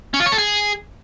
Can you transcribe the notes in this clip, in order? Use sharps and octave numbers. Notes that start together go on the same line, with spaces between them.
C#4
F4
C#5
A4
G#4